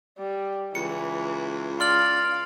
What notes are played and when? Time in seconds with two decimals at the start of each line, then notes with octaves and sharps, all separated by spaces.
0.18 G3
0.75 C#2 E3 C#7
1.80 D5 F5 C6 F6 F#7